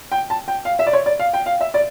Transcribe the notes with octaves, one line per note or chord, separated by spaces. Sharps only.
G5
A5
G5
F5
E5
D5
C#5
D5
F5
G5
F5
E5
D5